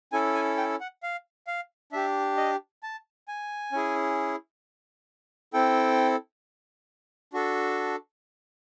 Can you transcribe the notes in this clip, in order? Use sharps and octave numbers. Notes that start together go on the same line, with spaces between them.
C#4 E4 A4 G#5
G#5
G5
F#5
F5
F5
D4 G4 E5
D#5
A5
G#5
C#4 E4 G#4
C4 E4 A4 G5
D4 F#4 A4